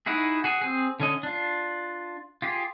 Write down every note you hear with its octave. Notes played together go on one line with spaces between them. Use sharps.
D#4 E4 F#4 G#4
F#4 G#4
C4 G#4
D3 C#4 D#5
D4 F4
F4 G4 G#4